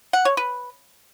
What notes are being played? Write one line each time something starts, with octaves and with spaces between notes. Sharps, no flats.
F#5
C#5
B4